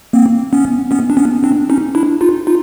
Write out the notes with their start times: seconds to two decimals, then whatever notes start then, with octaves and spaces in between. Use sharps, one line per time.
0.13 A#3 C4
0.53 B3 C#4
0.91 B3 C#4
1.10 D4
1.17 B3 C#4
1.43 C4 D4
1.70 C#4 D#4
1.95 D4 E4
2.21 D#4 F4
2.47 D#4 F4